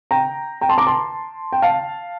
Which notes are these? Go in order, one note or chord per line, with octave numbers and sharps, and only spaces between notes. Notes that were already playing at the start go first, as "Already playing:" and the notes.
G5 A#5
G5 A#5
A5 C6
A#5 D6
A5 C6
G5
F5 A5